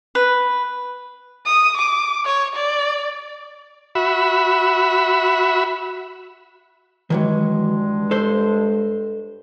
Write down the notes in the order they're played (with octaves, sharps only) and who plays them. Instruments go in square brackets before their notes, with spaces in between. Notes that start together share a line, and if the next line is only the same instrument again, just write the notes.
[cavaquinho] B4
[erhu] D#6
D6
C#5
D5
[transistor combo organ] F#4 E5 B5
[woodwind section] G2 G#3 [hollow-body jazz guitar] D#3 E3 F#3
[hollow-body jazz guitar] A4 C5